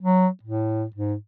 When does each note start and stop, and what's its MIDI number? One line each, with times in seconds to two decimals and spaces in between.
0.01 0.28 54
0.43 0.85 45
0.96 1.15 44